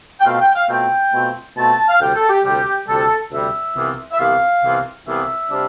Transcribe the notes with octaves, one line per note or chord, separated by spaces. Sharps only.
G5
B2 A3 C4 F4 F5
G5
F5
B2 A3 C4 F4 G5
B2 A3 C4 F4
B2 A3 C4 F4 A5
F5
D2 C3 G3 G5
A4
G4
D2 C3 G3 G4
D2 C3 G3 A4
D2 C3 G3 E5
C2 C3 E3 B3 F4
E5
C2 C3 E3 B3 F4 F5
C2 C3 E3 B3 F4
C2 C3 E3 B3 F4 E5
C3 G3 D4 F4